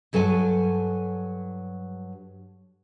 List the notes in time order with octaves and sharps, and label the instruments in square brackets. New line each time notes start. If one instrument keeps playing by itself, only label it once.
[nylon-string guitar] G2 F#3 A4 C#5 G#5